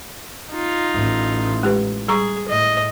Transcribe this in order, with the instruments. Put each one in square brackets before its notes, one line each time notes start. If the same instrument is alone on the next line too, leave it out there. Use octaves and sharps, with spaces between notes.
[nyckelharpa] D#4 F4
[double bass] A1
[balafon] G#3 G4 B4
[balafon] G3 A#5 C#6 [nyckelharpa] G#4
[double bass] A2 [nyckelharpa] D#5